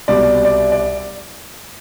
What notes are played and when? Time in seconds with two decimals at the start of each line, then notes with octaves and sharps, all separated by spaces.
0.08 C2 B2 G3 D5
0.45 D5
0.72 D5